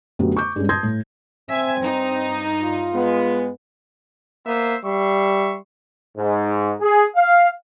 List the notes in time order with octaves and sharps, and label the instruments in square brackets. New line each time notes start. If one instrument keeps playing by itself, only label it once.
[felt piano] F#2 D3 A3 B3 G4
C#6 D6 G6
G2 G#3 C#4
A5 C6 D#6 G6 G#6 A#6
A2
[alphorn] C4 [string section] E5 G#5 G#6
[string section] G2 D#4
[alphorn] F4
[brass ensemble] G#3 B3
[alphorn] A#3 [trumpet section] B3 C5 E5
[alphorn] G3 [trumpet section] E5 C6 C#6
[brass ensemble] G#2
G#4
F5